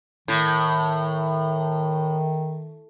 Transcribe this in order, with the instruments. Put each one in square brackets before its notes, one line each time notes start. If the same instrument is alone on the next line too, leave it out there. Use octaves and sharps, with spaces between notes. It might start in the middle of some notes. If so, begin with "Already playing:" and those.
[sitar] A2 [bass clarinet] D#3